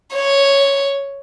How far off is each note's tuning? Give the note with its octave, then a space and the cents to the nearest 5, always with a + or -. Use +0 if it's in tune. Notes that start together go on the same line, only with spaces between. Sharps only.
C#5 +0